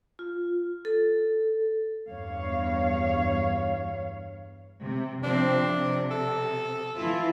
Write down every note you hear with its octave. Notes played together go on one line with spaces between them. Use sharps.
F4
A4
E2 G2 C#5 F5
C3
C3 F3 C4 D4
C3
A4
E3 E4 F4